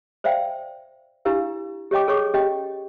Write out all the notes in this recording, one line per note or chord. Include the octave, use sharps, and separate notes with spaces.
C5 D5 E5 F5 G5
D4 E4 G4 B4 F5
G4 C#5 D#5 G5 D6
G#4 A4 C#5 C#6 D6
C#4 G4 D#5 G5